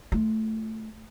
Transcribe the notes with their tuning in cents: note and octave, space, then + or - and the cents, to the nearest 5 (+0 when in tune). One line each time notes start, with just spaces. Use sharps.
A3 +0 F4 -5